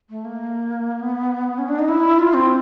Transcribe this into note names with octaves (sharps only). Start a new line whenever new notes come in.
A3
A#3
B3
C#4
D4
D#4
E4
F4
C4